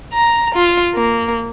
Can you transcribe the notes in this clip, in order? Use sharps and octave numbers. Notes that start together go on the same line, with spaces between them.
A#5
F4
A#3